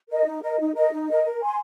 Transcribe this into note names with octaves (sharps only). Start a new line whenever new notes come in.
A#4 D#5
D#4
A#4 D#5
D#4
A#4 D#5
D#4
A#4 D#5
A#4
G#5 C6